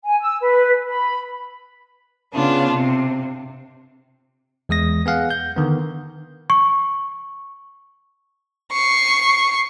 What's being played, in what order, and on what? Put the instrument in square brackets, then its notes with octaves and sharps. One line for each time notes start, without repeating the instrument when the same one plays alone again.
[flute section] G#5
E6
B4
B5
[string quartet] C#3 B3 D4 F4
C3
[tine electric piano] E2 G#3 D#6 A#6
B3 G#4 F5 F#5
G6
D3 D#3 B3
[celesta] C#6
[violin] C#6 C7